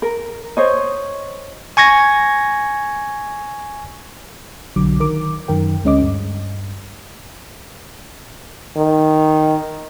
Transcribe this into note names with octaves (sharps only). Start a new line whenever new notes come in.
A#4
C5 C#5 D#5
G#5 C#6 G#6 A#6
B1 D3 F#3 D6
D#3 A#4 D6
F#2 D#3 A#4 G5
D2 G#3 C#4 D#5 D6
G2
D#3